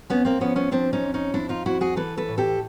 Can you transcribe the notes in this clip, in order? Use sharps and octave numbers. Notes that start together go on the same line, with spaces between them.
F2 B3 C#4
A#3 C4
F3 B3 C#4
B3 C#4
F3 C4 D4
C#4 D#4
F2
C#4 D#4
F2 D4 E4
D#4 F4
F2 E4 F#4
F#4 G#4
E3 A4 B4
A4 B4
A2
G4 A4